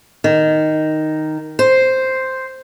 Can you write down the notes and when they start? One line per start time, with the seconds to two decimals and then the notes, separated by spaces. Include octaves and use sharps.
0.24 D#3
1.59 C5